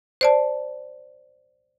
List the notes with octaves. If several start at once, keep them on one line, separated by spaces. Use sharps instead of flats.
C5 D5 A5